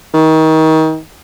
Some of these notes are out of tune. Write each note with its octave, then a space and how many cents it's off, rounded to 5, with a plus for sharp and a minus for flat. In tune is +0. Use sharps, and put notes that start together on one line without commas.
D#3 +30